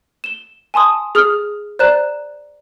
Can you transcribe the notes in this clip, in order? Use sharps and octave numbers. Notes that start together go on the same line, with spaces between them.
E7 G7
G#5 A5 C6 D#6
G#4 D#6 F6
C5 D5 A#5 F#6 E7